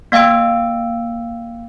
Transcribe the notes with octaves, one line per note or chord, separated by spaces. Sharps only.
A#3 F5 G5 E6 D7